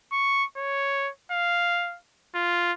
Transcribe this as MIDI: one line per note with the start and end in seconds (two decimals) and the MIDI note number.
0.12 0.45 85
0.57 1.10 73
1.32 1.98 77
2.35 2.72 65